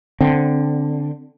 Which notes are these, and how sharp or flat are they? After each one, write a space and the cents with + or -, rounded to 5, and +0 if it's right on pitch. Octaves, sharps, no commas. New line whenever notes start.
D3 +0 C4 +0